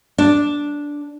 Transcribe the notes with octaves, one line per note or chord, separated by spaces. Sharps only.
D4